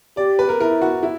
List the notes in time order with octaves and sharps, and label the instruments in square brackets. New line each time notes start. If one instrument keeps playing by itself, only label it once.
[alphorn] G4 [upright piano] D5
[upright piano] B4
A#4
[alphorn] E4 [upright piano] A#4
[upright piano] F#4
E4